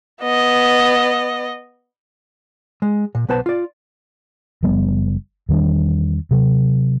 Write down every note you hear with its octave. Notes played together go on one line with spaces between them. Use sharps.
B3 D#5
G#3
A#2
B1 B3 B4 C5 A5
F4 D5
F#1 F3 G3 B3
E2 D#3 G3 D4
C3 F#3